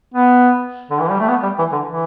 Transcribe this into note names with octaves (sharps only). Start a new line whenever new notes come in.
B3
D3
E3
G3
A3
B3
G3
E3
D3
E3